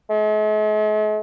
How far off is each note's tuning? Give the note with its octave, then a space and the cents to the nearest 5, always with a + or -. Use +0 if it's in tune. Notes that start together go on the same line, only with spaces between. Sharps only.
G#3 +45